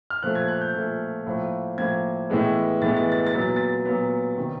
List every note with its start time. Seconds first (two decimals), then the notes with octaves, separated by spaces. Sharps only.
0.10 F6
0.23 A#2 F3 A3 F#6
0.35 G#6
0.48 F#6
0.61 G6
0.74 A#2 F3 A3
1.26 A2 F3 A#3
1.78 A2 F3 A#3 G#6
2.30 A2 E3 G#3 B3
2.81 A2 E3 G#3 B3 A6
2.97 A6
3.12 A6
3.26 A6
3.34 A#2 F#3 B3
3.41 A6
3.56 A6
3.85 A#2 F#3 B3
4.38 C3 D#3